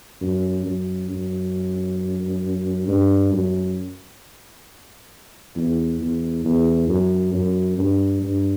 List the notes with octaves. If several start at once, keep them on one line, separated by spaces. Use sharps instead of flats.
F#2
F#2
F#2
G2
F#2
E2
E2
E2
F#2
F#2
G2
G2